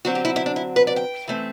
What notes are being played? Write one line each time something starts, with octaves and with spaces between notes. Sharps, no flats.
D3 F#3 C4 F#4
G4
E4
E4
D4
E4
B4
D5
G5
E3 A3 C4